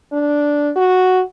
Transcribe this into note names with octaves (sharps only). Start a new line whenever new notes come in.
D4
F#4